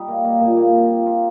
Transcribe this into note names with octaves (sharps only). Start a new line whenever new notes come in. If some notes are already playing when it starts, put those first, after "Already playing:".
Already playing: G3 D#4
A#3
A#3
A#2
A#3
C4
F4
F4